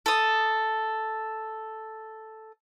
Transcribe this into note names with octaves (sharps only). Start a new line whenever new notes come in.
A4 D#6